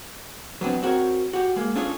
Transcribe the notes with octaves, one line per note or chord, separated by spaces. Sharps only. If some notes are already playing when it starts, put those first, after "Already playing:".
F#3 B3 C4 D4
C4 F#4 A#4 B4 C#5
F#4 G4
G#3 A#3
C#4 D4 F4 G#4 A4 C#5